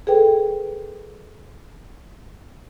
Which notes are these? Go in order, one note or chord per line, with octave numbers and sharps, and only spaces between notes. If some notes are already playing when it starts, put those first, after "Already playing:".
G#4 A4 B4 G5